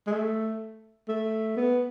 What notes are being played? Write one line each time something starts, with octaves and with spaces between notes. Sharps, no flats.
G#3
A3
A3
B3